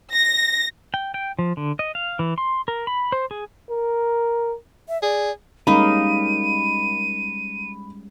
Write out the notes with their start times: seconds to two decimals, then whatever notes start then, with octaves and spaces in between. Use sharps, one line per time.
0.12 A#6
0.94 G5
1.14 G5
1.39 F3
1.57 D3
1.79 D#5
1.95 F5
2.19 E3
2.38 C6
2.68 A#4
2.87 B5
3.12 C5
3.31 G#4
3.70 A#4
4.89 E5
5.02 G#4 D5
5.67 G3 G#3 A#3 C#4 D#4 B5 D#7